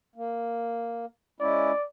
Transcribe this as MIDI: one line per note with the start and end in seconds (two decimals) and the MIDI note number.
0.15 1.05 58
1.40 1.71 56
1.40 1.71 61
1.40 1.71 64
1.40 1.85 74